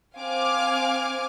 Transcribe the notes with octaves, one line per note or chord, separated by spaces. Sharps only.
C4 F5 G#5 D6 F6